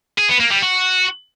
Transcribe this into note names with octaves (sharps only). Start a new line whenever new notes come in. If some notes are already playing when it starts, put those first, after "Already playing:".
G#4
B3
A#3
G3
F#4